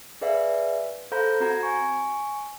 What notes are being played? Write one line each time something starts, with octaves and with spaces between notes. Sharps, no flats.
G#4 B4 D5 E5 F5
A4 C5 F5 A#5 B5 G6
C4 F#4 A#5 G#6
G#5 C#6